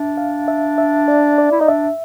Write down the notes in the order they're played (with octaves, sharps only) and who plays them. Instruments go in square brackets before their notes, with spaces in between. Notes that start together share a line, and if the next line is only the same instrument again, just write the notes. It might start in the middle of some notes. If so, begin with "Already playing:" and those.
Already playing: [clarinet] D4 [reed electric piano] E5
[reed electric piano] F5
E5
E5
D5
D5
[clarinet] E4
[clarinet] D#4 [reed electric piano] D#5
[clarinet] D4 [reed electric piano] E5